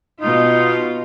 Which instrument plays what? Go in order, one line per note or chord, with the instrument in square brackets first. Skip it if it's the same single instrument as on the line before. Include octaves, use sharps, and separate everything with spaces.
[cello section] B2 F4 [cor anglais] D#4